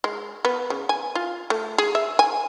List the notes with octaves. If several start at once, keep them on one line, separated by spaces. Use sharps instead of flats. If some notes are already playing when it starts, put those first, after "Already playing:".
G#3
B3
C#3
G#5
F4
A3
G#4
E5
G#5